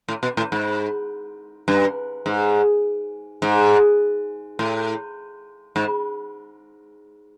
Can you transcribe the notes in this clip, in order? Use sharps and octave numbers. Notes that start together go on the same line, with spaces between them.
A2
B2
A2
G#2
G2
G#2
G#2
A2
G#2